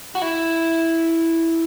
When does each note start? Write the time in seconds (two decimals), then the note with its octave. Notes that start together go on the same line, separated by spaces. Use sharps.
0.15 F#4
0.22 E4